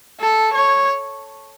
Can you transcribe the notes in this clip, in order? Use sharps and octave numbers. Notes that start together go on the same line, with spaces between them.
A4
C#5